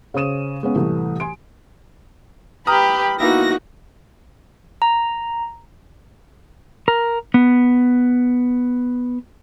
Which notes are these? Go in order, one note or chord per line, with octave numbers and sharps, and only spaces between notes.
C#3 C#4 C5 D#6 D#7 E7
G#3 B3 C#4 F5
C2 A2 E3 A3
G#5 C6 D7
G4 B4 A#5 B5 D#6 F6
A#3 B3 D#4 E4 F#4 A#6
A#5
A#4
B3